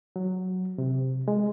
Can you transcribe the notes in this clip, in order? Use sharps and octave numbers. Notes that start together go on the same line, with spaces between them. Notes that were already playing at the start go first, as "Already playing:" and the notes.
F#3
C3
G#3